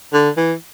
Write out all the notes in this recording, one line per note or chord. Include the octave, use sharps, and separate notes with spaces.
D3
E3